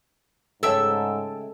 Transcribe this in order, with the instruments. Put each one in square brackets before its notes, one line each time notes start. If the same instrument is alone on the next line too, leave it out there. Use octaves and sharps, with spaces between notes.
[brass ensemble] G#2 [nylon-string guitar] C#3 G#3 C#5 [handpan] A4 [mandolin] E5 G5 E6